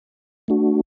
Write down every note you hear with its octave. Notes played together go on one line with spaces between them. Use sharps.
A3 D4 F#4